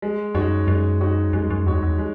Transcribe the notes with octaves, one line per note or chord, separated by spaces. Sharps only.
G#3
F#2 D#4 F#4 C#5
F#2 G#3
D#4 F#4 C#5
F#2 G#3
F#2
E2 D#4 F#4 C#5
E2
G#3